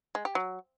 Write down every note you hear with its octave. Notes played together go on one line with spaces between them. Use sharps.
G#3
G4
F#3